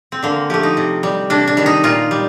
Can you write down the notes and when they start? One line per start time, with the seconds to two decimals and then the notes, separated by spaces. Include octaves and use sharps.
0.12 C4
0.23 D3 A#3
0.50 F3 A3 G4
0.63 D#4
0.77 C3
1.03 G3
1.30 C3 D4
1.47 D4
1.57 D#3 G3
1.66 D#4
1.83 A#2 F4
2.11 G3